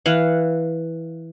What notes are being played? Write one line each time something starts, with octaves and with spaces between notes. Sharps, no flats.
E3 F5 F#5